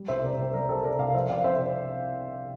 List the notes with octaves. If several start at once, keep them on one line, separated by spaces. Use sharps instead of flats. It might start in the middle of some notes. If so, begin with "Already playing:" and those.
Already playing: G3
C2 C5 E5
C3 A#4 D5
C2 C5
G3 A#4 D5
C2 A4 C5
C3 A#4 D5
C2 D5 F5
F3 C5 E5
C2 D5 F5
C3 C5 E5